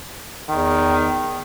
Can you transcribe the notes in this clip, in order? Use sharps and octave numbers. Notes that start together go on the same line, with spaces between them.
E2 D#3